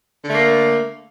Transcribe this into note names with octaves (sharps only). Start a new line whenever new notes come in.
D3 A3 A#3